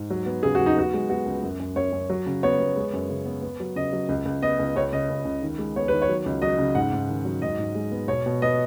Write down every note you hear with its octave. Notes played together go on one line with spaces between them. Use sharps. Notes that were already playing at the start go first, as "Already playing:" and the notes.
Already playing: G#2
F#3
B3
C#3 G#4
F#4
F#3
D#4
B3 F#4
G#3
B3 F#4
C#2
F#2
F#2
F#2 C#5
F#2
F#3
C#3
B3 C#5
B3
G#3
F#2
C#3
B3
B3
F#3
C#3 D#5
F#3
C#2
C#2
B3 D#5
C#2
C#2 C#5
C#3 D#5
C#2
C#2
D#3
G#3
B3 C#5
D#3 B4
C#5
F#3
C#2
F#3 D#5
C#3
G#2 F#5
G#2
D#3
F#3
G#2 D#5
G#2
G#3
B3
B2 C#5
B2
B3 D#5